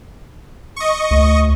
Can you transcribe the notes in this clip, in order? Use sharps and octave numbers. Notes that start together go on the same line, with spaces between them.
D#5 C#6
D2